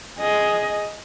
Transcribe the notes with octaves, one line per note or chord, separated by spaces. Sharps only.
G#4 D#5